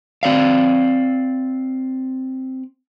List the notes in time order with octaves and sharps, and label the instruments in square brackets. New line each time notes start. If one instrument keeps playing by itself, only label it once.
[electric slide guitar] C4 D5 F5